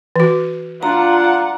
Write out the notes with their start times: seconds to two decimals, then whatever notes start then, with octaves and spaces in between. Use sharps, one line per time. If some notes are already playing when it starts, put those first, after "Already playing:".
0.16 E3 F#4
0.83 D4 F4 F#5 A#5